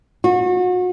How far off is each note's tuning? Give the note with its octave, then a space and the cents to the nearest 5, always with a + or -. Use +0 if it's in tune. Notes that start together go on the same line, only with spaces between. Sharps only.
F#4 -35